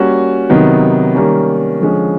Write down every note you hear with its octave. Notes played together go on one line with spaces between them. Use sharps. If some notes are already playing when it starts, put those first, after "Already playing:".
Already playing: G3 A#3 C#4 F#4
C3 D#3 F#3 B3 D#4
D#3 G3 A#3 C#4
D3 F3 G#3 C#4